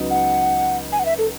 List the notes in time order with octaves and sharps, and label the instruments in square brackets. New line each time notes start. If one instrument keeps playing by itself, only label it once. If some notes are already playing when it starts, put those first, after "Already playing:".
Already playing: [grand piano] C#2 C#3 F#3 B3 D#4
[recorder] F#5
G#5
F#5
E5
A4